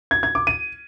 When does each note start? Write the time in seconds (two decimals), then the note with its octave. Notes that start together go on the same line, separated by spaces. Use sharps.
0.11 G#6
0.23 G#6
0.35 D6
0.47 D#7